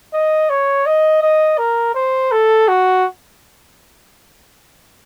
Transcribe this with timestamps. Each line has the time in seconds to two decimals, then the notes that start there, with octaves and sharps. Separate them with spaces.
0.13 D#5
0.49 C#5
0.86 D#5
1.22 D#5
1.58 A#4
1.95 C5
2.31 A4
2.68 F#4